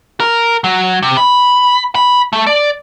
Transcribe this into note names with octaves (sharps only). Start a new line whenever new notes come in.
A#4
F#3
C3
B5
B5
A3
D5